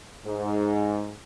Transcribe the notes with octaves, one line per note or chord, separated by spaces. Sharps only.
G#2